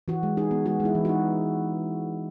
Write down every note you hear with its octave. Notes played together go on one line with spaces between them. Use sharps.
E3 F#4
G#3
D#4 G#4
B3
G#3 F#4
G#3
E4
E3
D#4 F#4